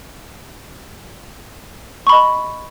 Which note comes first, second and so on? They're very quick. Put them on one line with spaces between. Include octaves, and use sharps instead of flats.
C#6 B5 D#5